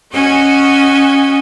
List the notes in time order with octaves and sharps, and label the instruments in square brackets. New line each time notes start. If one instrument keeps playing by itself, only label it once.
[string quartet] C#4 F#4 D#5 G#5